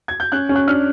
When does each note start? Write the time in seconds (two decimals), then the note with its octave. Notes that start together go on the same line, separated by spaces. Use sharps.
0.08 G#6
0.20 G6
0.32 C#4 F#6
0.49 C#4
0.55 F#6
0.67 D4 F6